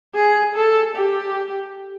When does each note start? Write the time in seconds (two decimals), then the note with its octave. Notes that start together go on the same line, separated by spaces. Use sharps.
0.15 G#4
0.55 A4
0.96 G4